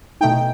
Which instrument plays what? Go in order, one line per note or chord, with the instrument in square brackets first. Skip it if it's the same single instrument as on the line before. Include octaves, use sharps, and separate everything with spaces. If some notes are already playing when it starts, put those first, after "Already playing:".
[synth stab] B2 A3 D#4 G5